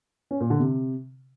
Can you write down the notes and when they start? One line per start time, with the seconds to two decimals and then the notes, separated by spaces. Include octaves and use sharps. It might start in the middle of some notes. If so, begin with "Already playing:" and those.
0.31 C#4
0.40 A#2
0.50 D3
0.60 C3